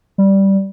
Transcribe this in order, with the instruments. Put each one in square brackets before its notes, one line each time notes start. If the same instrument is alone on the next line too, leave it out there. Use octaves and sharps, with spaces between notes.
[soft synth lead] G3